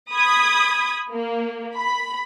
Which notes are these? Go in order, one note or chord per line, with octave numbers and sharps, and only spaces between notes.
B5 D#6 G#6
A#3
B5